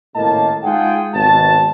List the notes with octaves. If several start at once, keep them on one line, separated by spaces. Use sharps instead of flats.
G#1 A2 C#3 A#3 D#5 A5
G#3 D#4 F4 G#4 F#5 G5
G#1 B2 A5